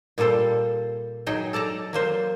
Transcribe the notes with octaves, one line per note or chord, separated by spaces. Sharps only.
A#2 G3 A#3 A4 C5
F#3 D#4 G#4 G5
A4 D5 A5 A#5
F#3 A#3 C5